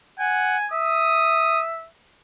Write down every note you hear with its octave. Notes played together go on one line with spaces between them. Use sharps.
F#5 G#5
E5 D#6